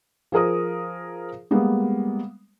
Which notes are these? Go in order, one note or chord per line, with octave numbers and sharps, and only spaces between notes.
F3 G#4 A#4 D#6
G3 G#3 A#3 B3